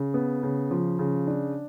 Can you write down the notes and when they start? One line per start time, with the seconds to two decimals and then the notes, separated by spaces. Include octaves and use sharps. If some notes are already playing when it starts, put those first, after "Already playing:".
Already playing: C#3
0.14 B3
0.43 C#3
0.71 F3
0.99 C#3
1.27 D4